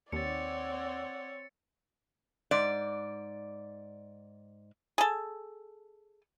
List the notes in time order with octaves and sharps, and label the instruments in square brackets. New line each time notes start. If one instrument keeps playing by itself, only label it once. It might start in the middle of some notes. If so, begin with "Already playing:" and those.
[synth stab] D#2 [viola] C4 C#5 [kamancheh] D5 F#5 [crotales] A6 C#7
[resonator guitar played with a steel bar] G#2 D5
[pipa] G#4 A4